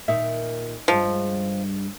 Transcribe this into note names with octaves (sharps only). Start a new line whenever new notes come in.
A#2 D#3 D#4 E5
G2 F3 G#3